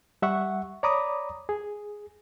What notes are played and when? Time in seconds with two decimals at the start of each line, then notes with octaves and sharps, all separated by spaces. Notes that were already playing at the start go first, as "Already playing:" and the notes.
0.22 G3 E5 F#5 C#6
0.83 C#5 D5 A#5 B5 D6 D#6
1.49 G#4